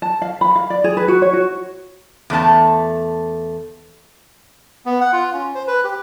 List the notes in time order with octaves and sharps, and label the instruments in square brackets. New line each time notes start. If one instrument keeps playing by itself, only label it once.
[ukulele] A5
F5
B5
F5
D5
G#4
B4
F#4
C#5
F#4
[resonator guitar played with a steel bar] E2 A3 D4 A5
[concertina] B3
F#5
F4
C#4
C5
B4
G4